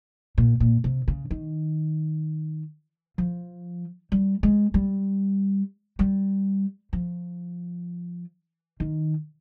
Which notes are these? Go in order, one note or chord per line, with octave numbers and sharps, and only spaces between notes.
A#2
A#2
C3
C#3
D#3
F3
G3
G#3
G3
G3
F3
D#3